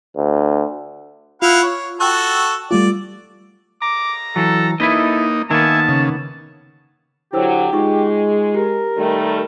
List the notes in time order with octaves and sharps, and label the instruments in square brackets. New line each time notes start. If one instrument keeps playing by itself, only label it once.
[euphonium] D2
[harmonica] E4 F5 F#5 [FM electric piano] F4
[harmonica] C#5
[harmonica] F#4 A4 [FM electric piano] G5 E6 F#6
[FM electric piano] G3 A3 F4 [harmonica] D5
[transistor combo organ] A#5 [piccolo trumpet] D6
[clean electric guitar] E3 F#3 [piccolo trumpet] A4
[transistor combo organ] A#3 D#4 [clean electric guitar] E4 B4 D#5 [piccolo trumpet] A4
[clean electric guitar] D#3 A#3 B3 [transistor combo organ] E5 G#5 [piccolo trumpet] A5
[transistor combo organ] C#3
[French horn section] D3 F#3 [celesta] E4 C5 E6 [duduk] G4
[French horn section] G#3 [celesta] D#4 F4 C#6
[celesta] G4 [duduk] A#4
[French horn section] D#3 G3 A3